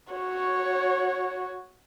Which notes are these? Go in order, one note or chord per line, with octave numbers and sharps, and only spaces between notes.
F#4 C#5